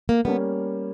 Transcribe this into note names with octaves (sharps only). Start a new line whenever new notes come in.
A#3
G3 A#3 B3 C#4